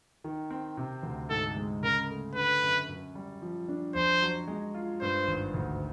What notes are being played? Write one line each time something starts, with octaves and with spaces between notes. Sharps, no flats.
D#3
C4
C3
D2
G#2 A4
G#3
C#3 A#4
A3
D3 B4
F#2
F#2
G3
F3
D4
F2 C5
F#3
G#3
F4
G2 C5
G#1
D2